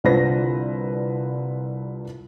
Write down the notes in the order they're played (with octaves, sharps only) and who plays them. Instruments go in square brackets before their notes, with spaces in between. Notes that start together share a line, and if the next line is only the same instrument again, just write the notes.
[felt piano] C2 D3 F4 B4 C5 A#6